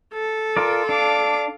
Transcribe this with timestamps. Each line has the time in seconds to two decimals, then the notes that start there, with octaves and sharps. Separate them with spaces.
0.14 A4
0.57 F4 A#4 D5
0.89 D4 F5 D6